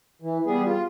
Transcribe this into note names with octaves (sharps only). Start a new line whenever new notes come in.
E3
G3 B3 G#4
F4